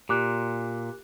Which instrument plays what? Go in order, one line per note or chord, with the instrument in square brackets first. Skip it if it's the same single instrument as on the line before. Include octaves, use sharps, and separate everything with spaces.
[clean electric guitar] A#2 [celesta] G4 D6 F#6